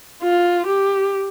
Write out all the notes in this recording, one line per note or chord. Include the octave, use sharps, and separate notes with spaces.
F4
G4